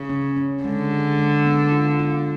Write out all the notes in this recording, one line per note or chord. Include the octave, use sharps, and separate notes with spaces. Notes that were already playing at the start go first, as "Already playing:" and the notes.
Already playing: C#3
C#4
C#4
D3 G#3
G#4
G#3
B3
F4
F4